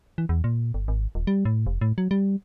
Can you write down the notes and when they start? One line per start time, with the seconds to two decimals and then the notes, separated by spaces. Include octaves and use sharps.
0.18 E3
0.29 E2
0.44 A#2
0.74 G1
0.88 G#1
1.15 D#1
1.27 G3
1.45 A2
1.67 F1
1.81 A2
1.98 F#3
2.11 G3